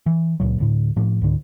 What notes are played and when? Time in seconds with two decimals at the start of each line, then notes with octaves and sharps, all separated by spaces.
0.06 E3
0.40 C#2 A#2 F#3
0.58 D1 D2 A2
0.96 A2 F3
1.21 C#2 G#2 D3